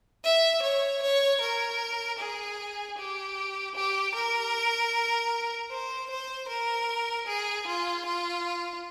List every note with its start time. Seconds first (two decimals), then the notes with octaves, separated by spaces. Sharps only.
0.24 E5
0.63 C#5
1.03 C#5
1.42 A#4
2.19 G#4
2.98 G4
3.76 G4
4.15 A#4
5.71 C5
6.11 C5
6.49 A#4
7.27 G#4
7.67 F4
8.06 F4